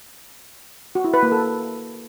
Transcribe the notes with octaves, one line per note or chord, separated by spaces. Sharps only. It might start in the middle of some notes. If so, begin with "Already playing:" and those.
F#4
E4
B4
A#3
A4